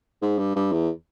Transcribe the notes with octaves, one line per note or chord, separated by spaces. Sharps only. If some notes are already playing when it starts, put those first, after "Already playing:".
G#2
G2
G2
E2